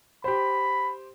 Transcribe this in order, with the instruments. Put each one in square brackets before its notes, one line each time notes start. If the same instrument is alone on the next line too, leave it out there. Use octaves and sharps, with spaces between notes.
[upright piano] G4 C5 [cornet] B5